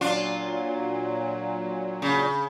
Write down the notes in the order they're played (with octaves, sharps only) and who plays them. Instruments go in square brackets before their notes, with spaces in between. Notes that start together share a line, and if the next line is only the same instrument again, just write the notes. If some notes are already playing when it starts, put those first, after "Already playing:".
[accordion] A#2 F#3 [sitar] D4 F4
[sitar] C#3